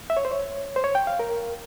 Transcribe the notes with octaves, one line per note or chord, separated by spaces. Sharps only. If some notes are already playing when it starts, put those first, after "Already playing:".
E5
C#5
C5
C#5
C5
C#5
G5
F5
A#4